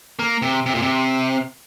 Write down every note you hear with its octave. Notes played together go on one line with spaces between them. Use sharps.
A#3
C3
C3
A#2
C3